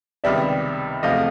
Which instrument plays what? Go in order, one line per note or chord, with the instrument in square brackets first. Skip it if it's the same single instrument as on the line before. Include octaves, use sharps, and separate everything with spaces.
[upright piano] C#2 C3 D#3 G3 B3 [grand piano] D5 E5
[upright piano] E2 C3 F3 A3 [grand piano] D#5 F5